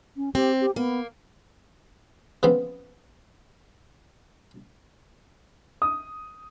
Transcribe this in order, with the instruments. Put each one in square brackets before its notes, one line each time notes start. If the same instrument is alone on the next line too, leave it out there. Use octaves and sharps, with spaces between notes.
[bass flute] C#4
[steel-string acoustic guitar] C4 [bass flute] G4
[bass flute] G4
[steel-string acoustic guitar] A#3 [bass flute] B3
[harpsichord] C#3 F3 B3 C4
[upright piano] D#6